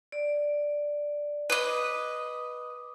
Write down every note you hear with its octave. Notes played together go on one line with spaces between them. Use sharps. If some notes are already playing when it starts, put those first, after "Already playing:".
D5
B4 D#5 D6 D#6